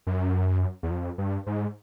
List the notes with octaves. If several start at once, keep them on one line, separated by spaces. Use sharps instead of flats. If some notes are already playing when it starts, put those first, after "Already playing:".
F#2
E2
F2
G2
G#2